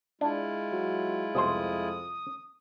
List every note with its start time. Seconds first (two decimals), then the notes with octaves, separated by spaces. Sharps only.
0.21 G#3 D4 E4 F4
0.72 F#3
1.35 C2 F2 B2 C5 D#6